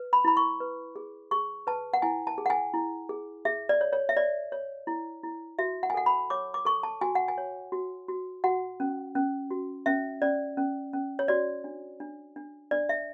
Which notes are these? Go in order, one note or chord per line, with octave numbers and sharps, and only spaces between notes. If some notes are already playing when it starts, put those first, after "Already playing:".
Already playing: B4
B5
E4 B5
C#6
B4
G#4
G#4 C#6
B4 A5
F#5
E4 G#5
A5
G#4
F#5
G#5
E4
G#4
G#4 E5
D5
C#5
C#5
E5
C#5 D5
C#5
E4
E4
F#4 E5
F#5
G#5
A4 F#5
B5
C#5 D6
D6
A4 C#6
A5
F#4 G#5
F#5
G#5
C#5
F#4
F#4
F#4 F#5
C#4
C#4
F#4
C#4 E5
C#4 D5
C#4
C#4
C#5
F#4 D5
D4
D4
D4
D4 D5
E5